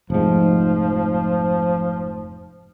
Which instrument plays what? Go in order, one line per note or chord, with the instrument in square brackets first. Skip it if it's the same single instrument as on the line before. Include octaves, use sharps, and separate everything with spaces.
[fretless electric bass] F1 G#2 [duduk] F3